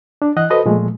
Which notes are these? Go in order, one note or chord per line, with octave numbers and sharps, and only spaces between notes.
D4
E3 D#5 F#5 F#6
F#4 A4 B4 C5 D#5
A#2 F3 G#3 A3